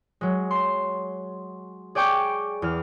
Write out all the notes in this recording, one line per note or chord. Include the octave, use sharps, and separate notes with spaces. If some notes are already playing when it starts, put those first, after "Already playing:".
F#3 G#3
C6
G#4 D5 G5 C#6 D6 G6
E2 F6